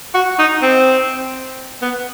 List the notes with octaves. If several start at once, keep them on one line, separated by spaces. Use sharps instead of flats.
F#4
D#4
C4
B3